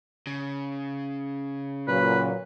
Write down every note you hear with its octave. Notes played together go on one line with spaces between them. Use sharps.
C#3
A#2 F#3 B4